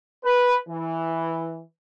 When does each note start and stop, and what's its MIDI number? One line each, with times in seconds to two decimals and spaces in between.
0.24 0.54 71
0.68 1.62 52